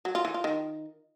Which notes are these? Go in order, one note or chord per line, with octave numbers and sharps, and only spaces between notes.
F#3
F4
E3
F4
D#3